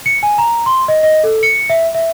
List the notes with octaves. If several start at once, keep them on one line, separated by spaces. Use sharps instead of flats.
C#7
G#5
A#5
C6
D#5
D#5
A4
C#7
E5
E5